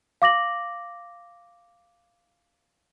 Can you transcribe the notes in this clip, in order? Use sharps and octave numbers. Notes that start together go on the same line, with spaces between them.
F5 D6 A#6 F#7